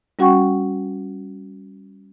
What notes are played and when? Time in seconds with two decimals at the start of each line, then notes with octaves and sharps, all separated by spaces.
0.19 G3 C#4 F#4 F#5 G5 C#6